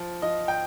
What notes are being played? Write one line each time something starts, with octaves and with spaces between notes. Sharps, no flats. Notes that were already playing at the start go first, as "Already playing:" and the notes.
Already playing: F3
F3 D#5
G5